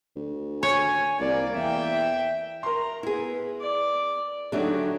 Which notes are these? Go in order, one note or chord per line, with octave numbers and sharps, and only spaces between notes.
D2
C#5 G#5
C2 A#3 D5
E2 E5 G5
A#4 A#5 C6
B3 E4 G#4 B4
D5 D6
D3 F#3 A3 D4 D#4 G4 G#4